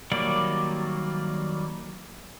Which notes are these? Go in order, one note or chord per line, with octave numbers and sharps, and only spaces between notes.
D#3 F#3 G3 A#3 D5